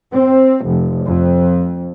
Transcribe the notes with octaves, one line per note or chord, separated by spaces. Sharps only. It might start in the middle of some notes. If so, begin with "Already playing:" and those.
C4
F1
F2